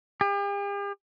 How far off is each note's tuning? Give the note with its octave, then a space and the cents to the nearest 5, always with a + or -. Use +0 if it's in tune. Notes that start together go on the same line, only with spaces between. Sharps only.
G4 +45